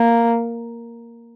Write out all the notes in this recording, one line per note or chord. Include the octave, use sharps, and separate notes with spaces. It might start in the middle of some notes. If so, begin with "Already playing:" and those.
Already playing: A#3